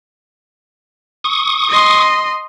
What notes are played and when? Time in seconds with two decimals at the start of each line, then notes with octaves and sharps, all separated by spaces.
1.24 C#6 D#6
1.70 D#5 C6